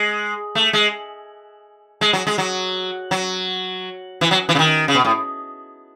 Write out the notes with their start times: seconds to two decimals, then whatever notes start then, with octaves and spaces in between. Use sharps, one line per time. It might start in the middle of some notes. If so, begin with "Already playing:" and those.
Already playing: G#3
0.55 A3
0.73 G#3
2.01 G#3
2.13 F#3
2.27 G#3
2.38 F#3
3.11 F#3
4.21 E3
4.31 F#3
4.49 E3
4.55 C#3
4.59 D#3
4.88 C#3
4.95 B2
5.05 A2